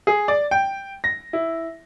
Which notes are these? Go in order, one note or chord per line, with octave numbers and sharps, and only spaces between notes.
G#4
D5
G5
A#6
E4